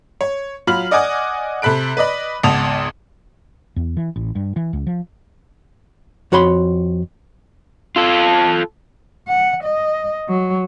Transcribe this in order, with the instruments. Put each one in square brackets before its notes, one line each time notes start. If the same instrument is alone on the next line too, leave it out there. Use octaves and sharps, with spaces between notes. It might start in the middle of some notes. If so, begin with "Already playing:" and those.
[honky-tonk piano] C#5
F#3 F4 B5 F6 F#7
D5 D#5 F#5 G#5 D6 D#6
C3 A4 B5 F#6 D7
B4 D5 D#5 B5
G#1 C#2 B3 A5 D#6 F7
[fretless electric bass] E2
E3
A1
G2
E3
C#2
F3
[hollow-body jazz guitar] F2 F#4 C#5 B5 C6
[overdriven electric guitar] F4 A4
[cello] F#5
D#5
F#3